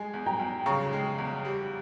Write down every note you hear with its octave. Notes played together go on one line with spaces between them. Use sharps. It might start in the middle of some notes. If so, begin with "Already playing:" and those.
Already playing: G#3 G#5
E2
G5 A#5
E2
C#3 A#5 C#6
G#3
E2
G3